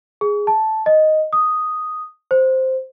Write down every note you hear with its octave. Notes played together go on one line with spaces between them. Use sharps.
G#4
A5
D#5
D#6
C5